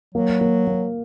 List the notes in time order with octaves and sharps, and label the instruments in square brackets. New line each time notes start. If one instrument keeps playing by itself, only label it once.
[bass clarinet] F#3 [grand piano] A#3
[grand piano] A#3
A#3